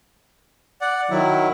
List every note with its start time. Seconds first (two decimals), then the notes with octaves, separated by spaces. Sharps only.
0.81 D5 F#5
1.10 D#3 F#3 E4